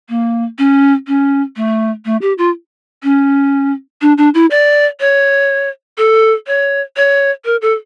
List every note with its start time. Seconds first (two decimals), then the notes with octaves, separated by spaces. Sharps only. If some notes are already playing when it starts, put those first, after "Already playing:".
0.09 A#3
0.58 C#4
1.07 C#4
1.56 A3
2.05 A3
2.22 G4
2.38 F4
3.03 C#4
4.02 D4
4.18 D4
4.34 E4
4.51 D5
5.00 C#5
5.98 A4
6.47 C#5
6.97 C#5
7.45 A#4
7.62 A4